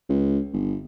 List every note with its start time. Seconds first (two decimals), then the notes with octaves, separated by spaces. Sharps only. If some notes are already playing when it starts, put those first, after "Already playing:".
0.09 C#2
0.53 G1